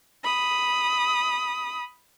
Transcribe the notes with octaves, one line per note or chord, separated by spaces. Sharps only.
B5 D#6